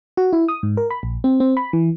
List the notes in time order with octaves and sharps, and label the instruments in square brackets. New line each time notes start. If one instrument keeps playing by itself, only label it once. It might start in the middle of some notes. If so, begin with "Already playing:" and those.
[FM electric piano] F#4
E4
D#6
G#2
A#4
B5
A#1
C4
C4
B5
E3